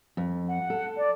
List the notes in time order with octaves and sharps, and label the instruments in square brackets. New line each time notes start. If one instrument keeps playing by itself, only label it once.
[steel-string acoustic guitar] F2
[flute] F#5
[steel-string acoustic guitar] A4
[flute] D5